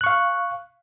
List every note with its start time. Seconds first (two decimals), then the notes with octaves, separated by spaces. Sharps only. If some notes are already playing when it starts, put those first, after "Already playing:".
0.01 F#6
0.04 C#6
0.06 F5